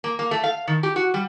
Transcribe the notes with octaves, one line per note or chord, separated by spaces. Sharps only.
A#3
A#3
A3
F5
D#3
G4
F#4
G3